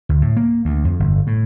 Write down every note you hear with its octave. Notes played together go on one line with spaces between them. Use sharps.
D2
A2
A#3
D2
F2
G1
A2